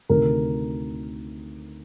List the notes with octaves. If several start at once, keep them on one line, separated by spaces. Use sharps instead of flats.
D2 C3 D#3 A#4